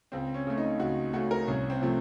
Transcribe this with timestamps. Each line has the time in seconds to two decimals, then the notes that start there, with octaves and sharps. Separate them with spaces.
0.12 C#2 C4
0.34 C#4
0.47 C#3 A3
0.57 D#4
0.80 C#2 F#4
1.13 C#3 A3 F#4
1.31 A#4
1.48 C2 C#4
1.70 C4
1.82 C3 F3 A3